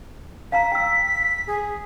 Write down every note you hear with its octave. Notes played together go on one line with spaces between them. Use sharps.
F5 A5 A#5 B6
G5 E6
G#4